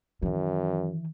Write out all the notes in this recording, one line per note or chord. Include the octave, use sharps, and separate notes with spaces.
F#2 D#3 E3